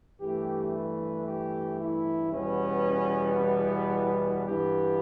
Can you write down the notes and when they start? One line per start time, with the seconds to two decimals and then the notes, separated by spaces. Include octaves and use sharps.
0.19 G2 E3 A3 G4
0.73 B4
1.25 G4
1.79 E4
2.32 E2 B2 G3 B3 C#4
3.40 E4
4.46 G2 E3 B3 G4